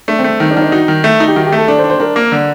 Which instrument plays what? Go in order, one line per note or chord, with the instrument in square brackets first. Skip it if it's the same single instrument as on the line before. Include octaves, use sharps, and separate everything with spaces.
[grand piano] A3 [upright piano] D4
[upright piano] C4
[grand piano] A3
[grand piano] D#3 [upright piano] D#4
[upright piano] D4
[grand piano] D#3 [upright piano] D#4
[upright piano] D4
[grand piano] D#4 [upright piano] F#4
[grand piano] D#3
A3
D#4
[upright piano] G4
[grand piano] D#3 [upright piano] F#4
[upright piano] G4
[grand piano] A3
[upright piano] A4
[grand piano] D4 [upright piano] A4
[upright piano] C5
[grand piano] D4
[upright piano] C5
[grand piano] D4 [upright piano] A#4
[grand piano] A#3
D3